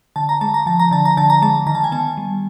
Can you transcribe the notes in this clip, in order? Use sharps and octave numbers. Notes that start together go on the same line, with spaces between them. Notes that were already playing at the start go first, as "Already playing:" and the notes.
D3 A5
A#5
G#3 A5
A#5
F3 A5
A#5
D3 A5
A#5
D3 A5
A#5
G#3 A5
D#3 A#5
A5
G#5
B3 A5
G3